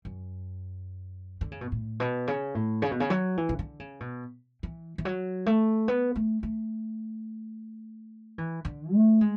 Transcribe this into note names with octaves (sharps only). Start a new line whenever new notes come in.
F#2
D3
C#3
B2
A2
B2
C#3
A2
C#3
B2
C#3
F#3
E3
C#3
D3
C#3
B2
E3
E3
F#3
A3
B3
A3
A3
E3
D3
A3
G#3